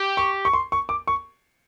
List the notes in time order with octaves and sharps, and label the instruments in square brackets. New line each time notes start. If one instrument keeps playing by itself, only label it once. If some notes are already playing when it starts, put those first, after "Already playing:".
Already playing: [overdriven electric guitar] G4
[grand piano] C#6
C#6
C6
C#6
D6
C#6